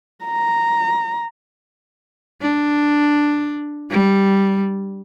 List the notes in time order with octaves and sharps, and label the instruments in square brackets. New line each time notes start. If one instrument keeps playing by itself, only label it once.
[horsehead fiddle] A#5
[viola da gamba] D4
G3